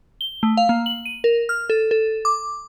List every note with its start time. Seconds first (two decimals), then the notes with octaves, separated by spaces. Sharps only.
0.21 G7
0.43 A3
0.57 F5
0.69 A#3
0.86 F#7
1.06 D#7
1.24 A#4
1.49 F6
1.70 A4
1.91 A4
2.25 D6